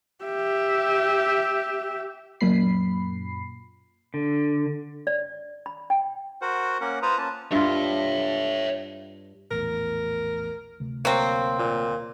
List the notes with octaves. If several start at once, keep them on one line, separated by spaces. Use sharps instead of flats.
G4 E5
F#2 A#2 B5 C7
D3
D5
B5
G5
F#4 A#4 C5 F#5
A#3 C#4 A#4 F#5
F4 B4 C5 A#5 D#6
A#3 C#4 A5
G2 F4 C#5 E5
A#1 E2 A2 A#4
D2 C3 A3
F#3 A#3 C4
A#2